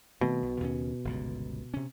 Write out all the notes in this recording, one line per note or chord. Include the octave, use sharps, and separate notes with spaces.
B2 D#3 A3 C4
B1
D#2 C#3 C#4
G1 C#2 A#2
C3 C#4